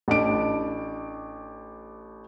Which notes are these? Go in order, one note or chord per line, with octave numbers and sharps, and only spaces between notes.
A1 D4 D7